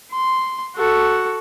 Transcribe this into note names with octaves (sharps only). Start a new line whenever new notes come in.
C6
F#4 A4